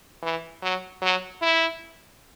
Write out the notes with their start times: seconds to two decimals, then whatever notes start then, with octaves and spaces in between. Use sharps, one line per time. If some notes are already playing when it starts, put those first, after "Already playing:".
0.23 E3
0.62 F#3
1.02 F#3
1.42 E4